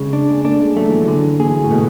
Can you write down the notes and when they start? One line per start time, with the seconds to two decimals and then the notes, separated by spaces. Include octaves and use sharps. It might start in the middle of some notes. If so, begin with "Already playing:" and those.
Already playing: C#3 G#3
0.13 D4
0.29 G#3
0.44 A3 D4
0.60 G#3
0.76 F#3 A3
0.89 E3
1.02 F#3
1.08 D3
1.40 E3 G#4
1.64 A2
1.71 B2 A3